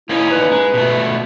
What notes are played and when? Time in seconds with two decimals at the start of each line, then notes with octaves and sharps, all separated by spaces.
0.09 A#3 C#4 D#4 E4
0.31 B4
0.52 G#3
0.74 B2 A3